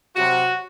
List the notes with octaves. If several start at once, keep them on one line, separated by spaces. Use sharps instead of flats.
C3 F#3 F#4